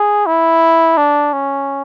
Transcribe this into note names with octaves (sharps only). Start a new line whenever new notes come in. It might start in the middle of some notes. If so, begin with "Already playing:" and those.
Already playing: G#4
E4
D4
C#4